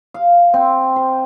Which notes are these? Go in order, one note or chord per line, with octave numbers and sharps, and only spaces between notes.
F5
C4
C5